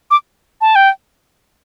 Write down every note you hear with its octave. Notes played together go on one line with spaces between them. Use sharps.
D6
A5
G5